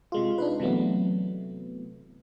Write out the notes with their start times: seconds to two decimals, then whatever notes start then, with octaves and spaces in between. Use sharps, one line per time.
0.12 C3 G#3 F4
0.38 D4 D#4 B4
0.60 C3 E3 F#3 A3 B3